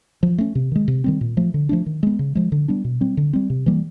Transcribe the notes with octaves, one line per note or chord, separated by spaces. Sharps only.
F3
A3 C#4
C3
D#3 G#3
C3
D#3 G3 C4
A#2
F3 A3
D3
F3 A3 D4
D#3
G#3 B3
C#3
F3 G#3
D3
G3 B3 D4
B2
G3 C4
D3
G3 C4
C3
E3 G3 A#3